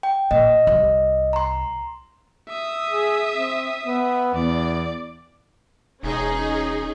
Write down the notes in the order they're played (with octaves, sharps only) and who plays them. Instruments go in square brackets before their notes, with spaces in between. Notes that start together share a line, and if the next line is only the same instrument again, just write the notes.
[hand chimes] G5
[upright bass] A#2 [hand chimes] D#5
[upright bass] C2
[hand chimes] A#5 C6
[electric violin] E5 D#6
[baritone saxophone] G#4
C4
B3
[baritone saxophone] E2 [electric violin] D5
[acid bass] E1 [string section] C#4 D#4 G#4